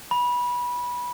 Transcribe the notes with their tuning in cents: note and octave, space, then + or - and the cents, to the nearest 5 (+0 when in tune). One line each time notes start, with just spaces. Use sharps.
B5 -20